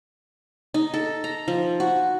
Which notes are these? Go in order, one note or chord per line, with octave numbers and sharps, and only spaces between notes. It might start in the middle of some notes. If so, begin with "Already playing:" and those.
D#4
A4
A#5
F3
F#4